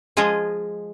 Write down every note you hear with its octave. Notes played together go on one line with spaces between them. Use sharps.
F3 G#3 F4 G#4 D#5